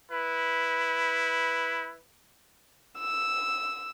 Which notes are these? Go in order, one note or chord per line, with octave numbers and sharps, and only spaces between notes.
E4 B4
E6